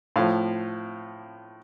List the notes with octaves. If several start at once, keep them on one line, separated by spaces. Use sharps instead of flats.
A2 F3 F5